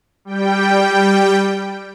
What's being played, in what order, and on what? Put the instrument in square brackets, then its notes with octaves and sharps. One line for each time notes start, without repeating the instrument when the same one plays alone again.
[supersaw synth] G3 G5